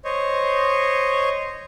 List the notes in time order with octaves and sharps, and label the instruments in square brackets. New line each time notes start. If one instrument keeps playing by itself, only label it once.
[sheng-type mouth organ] C5 C#5 D#5